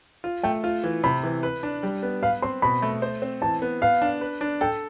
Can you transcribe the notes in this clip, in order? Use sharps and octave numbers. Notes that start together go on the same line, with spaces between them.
F4
A3 G5
F4
E3
C3 B5
E3
B4
D4
G3
B3
B4 F5
C4 C6
B2 B5
A3
C5
C4
E3 A5
B3
B3 F5
D4
B4
D4
A4 G5